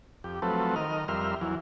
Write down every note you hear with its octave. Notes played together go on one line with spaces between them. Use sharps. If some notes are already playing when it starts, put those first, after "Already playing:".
F2 G4
F3 F#3 A3 C4 A4 B4
D#3 A#4 D#5 F6
F2 G3 A#4 E5 C6 F6
E2 E3 F#3